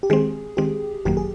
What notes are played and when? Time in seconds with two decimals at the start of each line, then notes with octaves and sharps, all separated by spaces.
0.03 G4
0.10 D#3 G#3 C4 G#4
0.57 D#3 G#3 C4 G4
1.05 G#1 F#2 D#3 F#3 A#3 G4
1.17 G#4